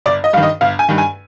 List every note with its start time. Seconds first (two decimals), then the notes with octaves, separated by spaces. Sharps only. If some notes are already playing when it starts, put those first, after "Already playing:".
0.06 G1 D5
0.24 D#5
0.33 G2 F5
0.37 D#3
0.43 D#5
0.61 G1 F5
0.79 G#5
0.89 G2 D#3
0.98 G#5